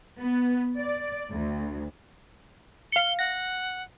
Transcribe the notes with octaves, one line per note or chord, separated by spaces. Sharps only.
B3
D5
D2
F5 C#7 G7
F#5 A#6